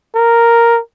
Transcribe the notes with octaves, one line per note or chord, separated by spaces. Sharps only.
A#4